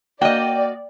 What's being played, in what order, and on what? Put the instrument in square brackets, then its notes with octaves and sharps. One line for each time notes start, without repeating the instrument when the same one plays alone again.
[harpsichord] A#3 [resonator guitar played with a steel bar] F#4 D#5 [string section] D5 [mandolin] G5